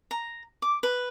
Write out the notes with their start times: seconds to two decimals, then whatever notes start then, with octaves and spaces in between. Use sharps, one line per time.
0.11 A#5
0.62 D6
0.83 B4